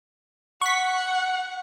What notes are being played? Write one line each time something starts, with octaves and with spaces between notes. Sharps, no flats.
F#5 C#6 B6